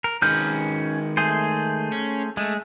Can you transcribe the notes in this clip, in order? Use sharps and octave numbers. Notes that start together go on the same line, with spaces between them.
A#4
D#3 G#3 C#4 B4 F6 G6
A3 G#4 C5
C#4
G#3 A3